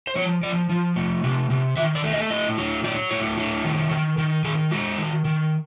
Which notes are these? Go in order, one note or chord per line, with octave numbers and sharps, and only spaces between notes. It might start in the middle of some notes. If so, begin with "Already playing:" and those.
C5
F3 C#5
F3 D5
F3
A3
C3
C3
D#3 E5
D5
A3
D#5
A2 D#5
F#3
F#3 D5
A2 C#5
F#3
D#3
D#3
D#3
D#3 G#4
G#3 F#4
D#3
D#3